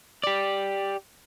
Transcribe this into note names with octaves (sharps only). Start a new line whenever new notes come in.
G4 D5